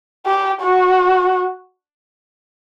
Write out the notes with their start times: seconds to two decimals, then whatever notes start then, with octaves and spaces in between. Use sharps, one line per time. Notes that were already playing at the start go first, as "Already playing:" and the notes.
0.26 G4
0.62 F#4